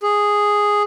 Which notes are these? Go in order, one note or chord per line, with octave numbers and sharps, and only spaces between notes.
G#4